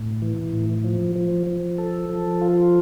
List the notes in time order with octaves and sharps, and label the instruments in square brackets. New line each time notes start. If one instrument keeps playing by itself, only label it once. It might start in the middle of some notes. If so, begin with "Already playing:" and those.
Already playing: [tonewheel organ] A2
E3
A2
F3
F3
F3
A4
F3
F4